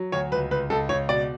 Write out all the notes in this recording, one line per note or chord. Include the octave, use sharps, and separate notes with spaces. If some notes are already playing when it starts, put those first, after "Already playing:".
Already playing: F#3
D2 C#5
C#2 B4
C#2 B4
C#2 A4
C#2 C#5
B2 D5